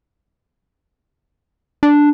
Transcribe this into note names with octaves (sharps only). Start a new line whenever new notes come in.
D4